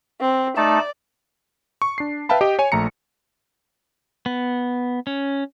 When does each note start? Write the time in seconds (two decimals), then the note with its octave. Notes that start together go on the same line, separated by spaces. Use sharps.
0.21 C4
0.57 A3 D#4 D5 A5
1.82 C#6
1.98 D4 C7
2.29 B4 E5 F5 G5 A5 B5
2.41 G4 D#5 G5
2.59 C#5 G#5
2.72 A#1 A3 A#5 C#7
4.26 B3
5.07 C#4